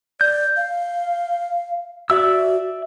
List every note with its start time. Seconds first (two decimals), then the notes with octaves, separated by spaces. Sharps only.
0.21 D5 G6
0.57 F5
2.10 F#4 D5 E5 E6